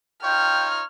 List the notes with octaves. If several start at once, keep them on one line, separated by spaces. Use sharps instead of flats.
D#4 F4 C#5 G5 F6